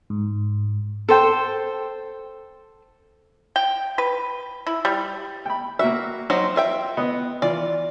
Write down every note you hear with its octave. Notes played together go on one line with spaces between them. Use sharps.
G#2
A4 C5 G5
G5
B4
E4
G3
G5 B5
A#3 F#4 E5
F#3 C4 D#4
F4 E5 G5
B3 D#5
E3 F4 D5